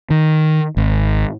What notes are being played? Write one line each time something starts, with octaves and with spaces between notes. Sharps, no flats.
D#3
G#1